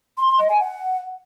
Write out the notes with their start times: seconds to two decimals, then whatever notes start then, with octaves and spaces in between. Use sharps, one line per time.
0.17 C6
0.28 C6
0.38 D#5
0.49 G#5
0.60 F#5